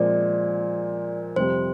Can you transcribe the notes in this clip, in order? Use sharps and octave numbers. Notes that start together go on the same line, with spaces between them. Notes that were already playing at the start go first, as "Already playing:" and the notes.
Already playing: A#2 F3 G#3 C4 D5
F2 C3 G3 C4 C5